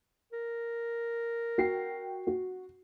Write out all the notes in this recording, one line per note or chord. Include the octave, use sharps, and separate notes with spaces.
A#4
F#4 G5 C7
F#4